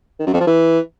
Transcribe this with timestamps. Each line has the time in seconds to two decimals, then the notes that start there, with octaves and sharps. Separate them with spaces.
0.20 D#3
0.27 F#2
0.33 F2
0.40 F3
0.47 E3